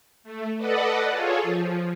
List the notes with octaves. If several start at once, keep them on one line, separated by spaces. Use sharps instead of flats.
A3
A4 B4 D5 D#5 F#5
F4 G#4 A4 C#5
F3